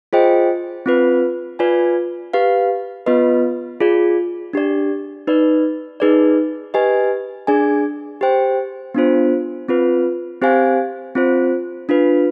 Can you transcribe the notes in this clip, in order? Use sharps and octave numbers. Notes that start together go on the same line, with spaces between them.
F4 G#4 C5 D#5 G5
C4 F4 B4
F4 B4 D5 G#5
G4 B4 F5
B3 F4 B4 D#5
F4 G#4 D5
D4 G4 D5
D#4 B4 D5
D#4 G#4 B4 D5
G4 B4 D#5 G#5
D4 G#4 D5 G#5
G4 C5 G5
B3 D4 F4 C5
C4 F4 B4
C4 G4 C5 F5 G#5
C4 F4 C5
D4 F4 B4